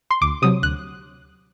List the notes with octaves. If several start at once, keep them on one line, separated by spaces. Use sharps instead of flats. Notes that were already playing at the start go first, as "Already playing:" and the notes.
C6
D2 D6
C3 F#3 D#6
D2 F#6